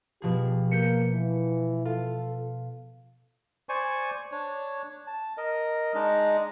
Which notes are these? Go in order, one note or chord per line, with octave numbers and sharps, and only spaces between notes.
B2 F3 G4 G#4
A#3 G6 B6 C#7
E3
F4 A4
C5 D5 G#5 C#6
D4 C#5
A5
A#4 D#5
G#3 D4 D#4 D#5